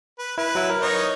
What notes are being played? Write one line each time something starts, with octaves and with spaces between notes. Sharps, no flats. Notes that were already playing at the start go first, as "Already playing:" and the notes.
B4
E4 B4
F#3 E4
A#4
D#4 C#5 D#5